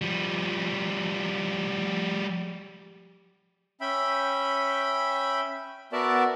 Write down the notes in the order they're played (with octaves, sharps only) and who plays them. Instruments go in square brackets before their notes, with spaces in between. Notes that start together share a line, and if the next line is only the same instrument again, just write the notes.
[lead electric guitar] F3 G3
[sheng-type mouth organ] C#4 E5 G5 B5
B3 F#4 A#4 D5 E5 A5